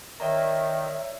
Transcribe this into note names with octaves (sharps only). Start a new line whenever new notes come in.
D#3 C#5 D5 E5 A#5